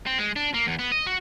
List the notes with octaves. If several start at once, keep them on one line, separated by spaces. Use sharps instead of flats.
C4
G#3
D4
A#3
E2
B3
D#5
F#4